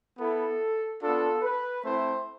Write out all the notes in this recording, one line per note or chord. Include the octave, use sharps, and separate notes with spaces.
B3 E4 A4
B3 D4 F4 A4
B4
A3 C4 E4 C5